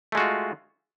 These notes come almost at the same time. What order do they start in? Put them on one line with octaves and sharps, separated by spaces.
A3 G#3 F#4 F4